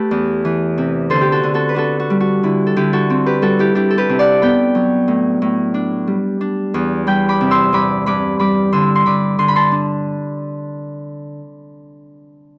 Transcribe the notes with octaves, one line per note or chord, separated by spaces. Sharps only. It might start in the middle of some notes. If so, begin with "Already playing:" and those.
Already playing: A3 G4 A4 B4
E2
E3
C3
D3 A4 C5
G4
F#4 A4
D3
F#4 A4
B4
D4 F#4 A4
F#4
G3
F#4
D3 E4
A4
D3 E4 G4
F#4 A4
C4
G4 B4
G3 F#4 A4
E4 G4
D4 E4 G4
A4
G4 B4
C3
D5 F#5
B3 G5 B5
F#3
A2
A2
D4
G3
D4
E2
G3 G5 B5
B5 D6
C3
C6 E6
G2 B5 D6
G2 B5 D6
G3 B5 D6
D3 C6 E6
C6
D3 B5 D6
D3 C6
B5
A5 C6
D4